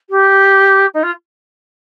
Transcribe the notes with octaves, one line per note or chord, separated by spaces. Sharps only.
G4
D#4
F4